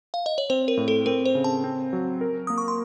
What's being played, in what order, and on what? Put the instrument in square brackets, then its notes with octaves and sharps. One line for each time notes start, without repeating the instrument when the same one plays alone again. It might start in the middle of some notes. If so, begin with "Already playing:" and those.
[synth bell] F5
D#5
C#5
[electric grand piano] C4 [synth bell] C5
[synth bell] A#4
[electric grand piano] A2
[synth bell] A4
[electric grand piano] C4 [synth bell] A#4
[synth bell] C5
[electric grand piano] C#3
[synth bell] A5
[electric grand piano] C4
F#3
A#4
[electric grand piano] A#3 [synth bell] D#6
[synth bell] C#6
C6